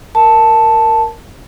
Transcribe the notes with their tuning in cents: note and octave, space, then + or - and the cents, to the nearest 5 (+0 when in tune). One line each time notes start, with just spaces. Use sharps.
A#4 +0 A5 +0